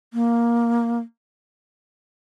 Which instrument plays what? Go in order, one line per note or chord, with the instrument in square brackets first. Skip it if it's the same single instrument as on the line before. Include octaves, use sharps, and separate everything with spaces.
[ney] A#3